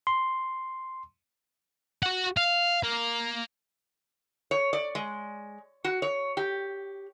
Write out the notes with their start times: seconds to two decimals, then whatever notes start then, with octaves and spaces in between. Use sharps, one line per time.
0.07 C6
2.02 F#4 F#5
2.37 F5
2.83 A#3
4.51 C#5
4.73 D5
4.95 G#3
5.84 F#4
6.02 C#5
6.37 G4